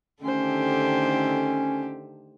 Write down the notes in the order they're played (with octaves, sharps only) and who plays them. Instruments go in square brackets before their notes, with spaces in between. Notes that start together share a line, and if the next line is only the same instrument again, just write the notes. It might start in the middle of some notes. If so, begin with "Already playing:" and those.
[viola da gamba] D3 D#3 G4 [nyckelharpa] A3 C5 [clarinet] C#4